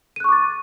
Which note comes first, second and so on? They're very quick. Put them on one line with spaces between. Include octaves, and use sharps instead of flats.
D#7 F#6 C#6 D6 A6